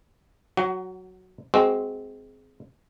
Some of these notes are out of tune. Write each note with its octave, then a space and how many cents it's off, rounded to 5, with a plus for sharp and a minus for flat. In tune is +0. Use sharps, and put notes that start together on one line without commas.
F#3 +0 F#4 +25
G#3 +10 C4 -10 F#4 +5